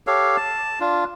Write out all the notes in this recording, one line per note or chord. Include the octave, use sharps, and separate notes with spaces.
G4 A4 C#5 F5
A5
D4 F4